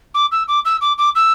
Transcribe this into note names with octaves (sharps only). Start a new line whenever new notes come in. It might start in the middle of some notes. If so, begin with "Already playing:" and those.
D6
E6
D6
E6
D6
D6
E6